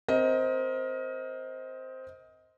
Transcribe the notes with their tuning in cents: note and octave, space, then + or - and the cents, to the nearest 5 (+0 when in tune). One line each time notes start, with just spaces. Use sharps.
C4 +0 A#4 +15 D#5 +25